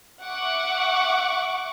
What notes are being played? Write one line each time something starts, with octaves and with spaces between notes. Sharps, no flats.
E5 F#5 C#6 D6